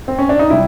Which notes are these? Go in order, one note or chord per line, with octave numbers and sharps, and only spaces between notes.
C4
C#4
D4
D#4
C3 G3 E4